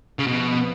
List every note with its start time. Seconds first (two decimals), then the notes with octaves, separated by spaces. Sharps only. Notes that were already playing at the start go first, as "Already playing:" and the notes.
0.19 C#3
0.27 B2 F3 B3